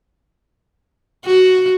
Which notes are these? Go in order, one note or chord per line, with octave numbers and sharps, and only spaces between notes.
F#4